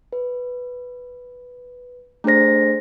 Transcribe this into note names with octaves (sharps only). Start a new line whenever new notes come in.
B4
A3 D4 G#4 C5 A#6